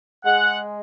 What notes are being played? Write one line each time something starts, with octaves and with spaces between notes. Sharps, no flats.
G#3 F#5